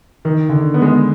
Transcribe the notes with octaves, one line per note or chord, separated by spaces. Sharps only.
D#3
D3
B3
G#3
B3